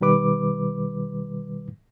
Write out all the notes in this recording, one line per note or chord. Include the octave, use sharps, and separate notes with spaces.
B2 D#3 G3 B4 D6